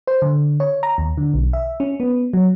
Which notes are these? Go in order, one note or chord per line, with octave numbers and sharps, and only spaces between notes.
C5
D3
C#5
A#5
D#2
D3
B1
E5
C#4
B3
F#3